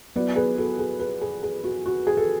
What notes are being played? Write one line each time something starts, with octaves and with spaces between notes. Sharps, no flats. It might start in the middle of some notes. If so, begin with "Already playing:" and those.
F#3 B3 E4 B4 D5
G#4 B4
F#4 A4
G#4
G#4 B4
G#4
G#4
F#4
F#4
G#4
A4